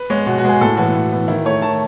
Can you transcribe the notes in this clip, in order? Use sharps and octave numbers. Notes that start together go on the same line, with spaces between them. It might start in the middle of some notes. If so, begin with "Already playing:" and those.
Already playing: B4
G#3 B3 C#5
B2 F#4
F#4
G#3 B3 G#4
A2 A4
E3 B3 F#4
A2
E3 B3
D#3 E4
A3 C#5
D#3 A5